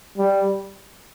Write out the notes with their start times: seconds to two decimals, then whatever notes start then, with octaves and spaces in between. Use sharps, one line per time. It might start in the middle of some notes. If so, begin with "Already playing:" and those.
0.18 G3